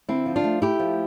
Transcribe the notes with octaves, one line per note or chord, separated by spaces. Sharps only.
D3 C4 E4
F3
D4 F4
A3
A3 E4 G4
F3